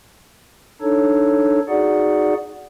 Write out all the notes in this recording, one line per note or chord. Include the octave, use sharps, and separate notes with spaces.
D4 D#4 A4 C#5
D#4 F#4 G#4 D5 F#5